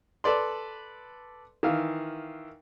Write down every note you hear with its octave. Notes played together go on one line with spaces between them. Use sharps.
A4 B4 D5 C6
D#3 E3 F5